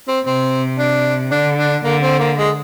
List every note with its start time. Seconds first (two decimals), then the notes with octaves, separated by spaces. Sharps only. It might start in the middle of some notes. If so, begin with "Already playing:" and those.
0.08 C4
0.25 C3 C4
0.78 D4
1.31 D3 D4
1.58 D4
1.84 D3 A#3
2.02 C4
2.20 A#3
2.38 G#3